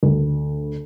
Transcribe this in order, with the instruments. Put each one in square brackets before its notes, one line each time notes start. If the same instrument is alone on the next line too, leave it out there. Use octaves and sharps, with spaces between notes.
[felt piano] D2